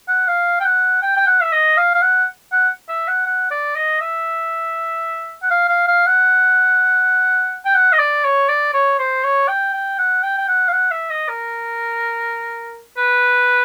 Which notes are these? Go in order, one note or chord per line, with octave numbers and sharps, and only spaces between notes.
F#5
F5
G5
F#5
G5
G5
F#5
E5
D#5
F5
F5
F#5
F#5
E5
F#5
F#5
D5
D#5
E5
F#5
F5
F5
F5
F#5
G5
F#5
D#5
D5
C#5
D5
C#5
C5
C#5
G5
G5
F#5
G5
G5
F#5
F5
F#5
E5
D#5
A#4
B4